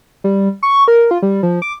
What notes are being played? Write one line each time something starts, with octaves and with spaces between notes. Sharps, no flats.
G3
C#6
A#4
F4
G3
F3
D6